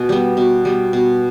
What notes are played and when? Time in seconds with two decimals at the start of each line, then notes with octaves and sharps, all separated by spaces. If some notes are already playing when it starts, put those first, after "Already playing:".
Already playing: B2 G#5
0.09 G3 B3
0.37 B2
0.65 G3 B3
0.93 B2